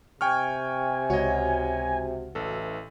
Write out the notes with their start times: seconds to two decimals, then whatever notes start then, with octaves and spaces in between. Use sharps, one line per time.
0.21 C3 G5 G#5 C#6 F6
1.10 C#2 F#4 C#5 D#5
2.35 A1 E3 A4